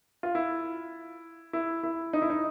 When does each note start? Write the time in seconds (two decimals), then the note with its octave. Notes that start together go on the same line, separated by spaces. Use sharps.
0.23 F4
0.35 E4
1.53 E4
1.83 E4
2.13 D#4
2.22 E4
2.30 D#4